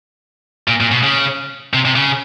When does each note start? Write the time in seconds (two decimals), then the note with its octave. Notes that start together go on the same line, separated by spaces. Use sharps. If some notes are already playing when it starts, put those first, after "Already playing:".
0.68 A#2
0.81 A#2
0.92 B2
1.03 C#3
1.74 C3
1.85 C3
1.96 C#3